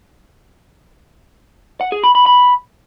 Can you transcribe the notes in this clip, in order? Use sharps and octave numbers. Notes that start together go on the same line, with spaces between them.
F#5
G#4
B5
B5
B5